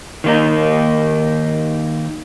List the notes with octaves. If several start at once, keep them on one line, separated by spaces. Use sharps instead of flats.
D#3 A#3 D#4